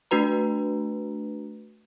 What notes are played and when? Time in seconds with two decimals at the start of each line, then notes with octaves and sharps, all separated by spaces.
0.11 A3 D4 F#4 B4 A#5